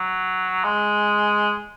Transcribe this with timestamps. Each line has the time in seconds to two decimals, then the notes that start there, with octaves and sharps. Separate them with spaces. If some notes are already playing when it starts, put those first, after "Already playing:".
Already playing: F#3
0.64 G#3